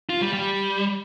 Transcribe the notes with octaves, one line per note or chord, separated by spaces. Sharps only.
F4
G3
G3